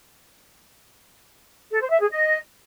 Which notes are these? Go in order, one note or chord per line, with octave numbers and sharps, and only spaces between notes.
A4
C5
E5
G#4
D#5